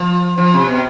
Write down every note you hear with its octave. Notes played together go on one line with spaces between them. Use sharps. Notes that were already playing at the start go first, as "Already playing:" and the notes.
Already playing: F3
F3
C3
B2